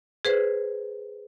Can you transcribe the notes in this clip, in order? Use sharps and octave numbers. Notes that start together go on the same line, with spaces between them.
G#4 B4 C5